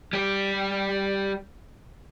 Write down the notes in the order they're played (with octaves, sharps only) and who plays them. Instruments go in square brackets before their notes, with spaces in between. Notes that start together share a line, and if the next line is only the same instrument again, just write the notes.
[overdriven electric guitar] G3 G4